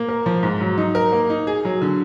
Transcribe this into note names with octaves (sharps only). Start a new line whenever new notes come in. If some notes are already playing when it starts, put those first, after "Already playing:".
Already playing: A#3
A#4
F3
G#2
F#3
D#4
A#4
A#3
D#4
G#4
F#3
D3